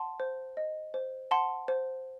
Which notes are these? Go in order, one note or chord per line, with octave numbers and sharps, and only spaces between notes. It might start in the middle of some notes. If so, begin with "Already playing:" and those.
Already playing: F#5 A5 C6
C5
D#5
C5
F#5 A5 C6
C5